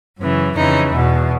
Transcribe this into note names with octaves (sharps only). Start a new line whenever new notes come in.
F#2 C#3 E3
F2 C#3 E3 D#4
E2 B2